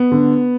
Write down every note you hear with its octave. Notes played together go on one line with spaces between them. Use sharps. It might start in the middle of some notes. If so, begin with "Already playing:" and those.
Already playing: B3
D3